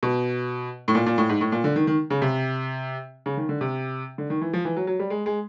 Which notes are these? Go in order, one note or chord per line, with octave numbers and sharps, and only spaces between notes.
B2
A2
A#2
A#2
A2
G#2
A2
A#2
D3
D#3
D#3
C#3
C3
C#3
D#3
D3
C3
D3
D#3
E3
F3
E3
F#3
F#3
G3
G#3
G#3